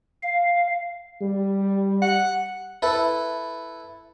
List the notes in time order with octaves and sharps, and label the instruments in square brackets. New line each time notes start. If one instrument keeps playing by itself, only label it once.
[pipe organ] F5
[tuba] G3
[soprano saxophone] F#5
[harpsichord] E4 A4 B4